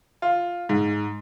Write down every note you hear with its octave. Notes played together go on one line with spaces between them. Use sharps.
F4
G#2